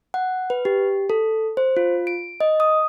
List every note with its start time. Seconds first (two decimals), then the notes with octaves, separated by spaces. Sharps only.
0.14 F#5
0.50 B4
0.65 G4
1.10 A4
1.57 C5
1.77 F4
2.07 D7
2.40 D#5
2.60 D#6